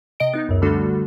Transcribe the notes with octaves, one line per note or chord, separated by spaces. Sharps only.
C3 D#5 D7
B3 D#4
C#2 F#2
D3 G3 A3 D4 F#4 A4